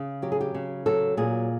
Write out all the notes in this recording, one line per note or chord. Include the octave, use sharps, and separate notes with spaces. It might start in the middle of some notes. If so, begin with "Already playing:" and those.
Already playing: C#3
F#3 G4
G#4
G4
C#3
F#3 A4
A#2 G#4